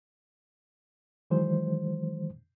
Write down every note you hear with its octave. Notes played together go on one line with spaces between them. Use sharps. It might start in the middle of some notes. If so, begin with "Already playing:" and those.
D#3 E3 F#3 G#3 C5